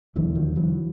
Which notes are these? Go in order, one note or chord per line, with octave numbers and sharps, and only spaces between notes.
E1 D#2 D3 E3 F#3
D#3 F3
E3 F#3